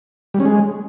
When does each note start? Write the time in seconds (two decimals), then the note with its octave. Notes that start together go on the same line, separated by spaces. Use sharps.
0.34 G3
0.40 C#4
0.45 G#3